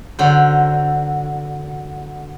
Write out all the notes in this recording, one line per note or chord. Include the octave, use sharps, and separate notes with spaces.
D3 F#3 C5